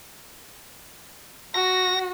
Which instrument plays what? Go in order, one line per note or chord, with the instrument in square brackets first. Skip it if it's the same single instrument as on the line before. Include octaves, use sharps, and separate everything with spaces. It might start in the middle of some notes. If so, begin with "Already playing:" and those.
[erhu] F#4 [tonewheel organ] A#6